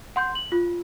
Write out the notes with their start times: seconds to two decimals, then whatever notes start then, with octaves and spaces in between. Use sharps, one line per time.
0.16 F#5 C6 G6
0.35 F#7
0.52 F4